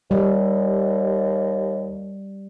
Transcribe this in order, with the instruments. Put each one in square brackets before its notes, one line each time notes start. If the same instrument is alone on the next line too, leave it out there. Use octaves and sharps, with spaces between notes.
[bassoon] D#2 [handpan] G3